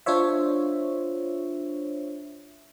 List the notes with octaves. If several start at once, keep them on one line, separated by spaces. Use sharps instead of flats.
D4 F4 C5 C#5 E5